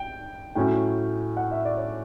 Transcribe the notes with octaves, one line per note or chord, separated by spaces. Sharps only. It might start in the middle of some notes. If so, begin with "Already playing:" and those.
Already playing: G5
A2 F#3 C#4 G5
F#5
E5
D5
C#5